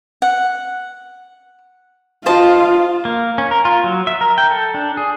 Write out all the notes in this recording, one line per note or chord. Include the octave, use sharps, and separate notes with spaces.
F#5
F4 C5 D#5 A5
A#3
C#4
A#4
F4
F#3
E5
A#4
G5
A4
D4
G#4